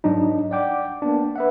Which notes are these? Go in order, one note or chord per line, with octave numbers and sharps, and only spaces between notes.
G#2 F#3 D4 D#4
D5 F#5 G5 D6
A#3 B3 D4
B4 E5 F#5